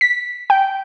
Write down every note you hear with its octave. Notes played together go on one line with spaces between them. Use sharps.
B6
G5